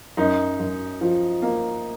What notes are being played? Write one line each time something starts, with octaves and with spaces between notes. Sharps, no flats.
F#2 D#4
F#2
F3
A#3